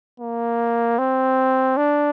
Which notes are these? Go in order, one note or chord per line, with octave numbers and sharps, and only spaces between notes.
A#3
C4
D4